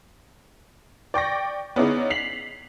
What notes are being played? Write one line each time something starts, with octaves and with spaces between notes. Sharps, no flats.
D5 G5 C#6 A#6
B3 C#4 D#4 E4 G#4 D5
B6 C7 F7 F#7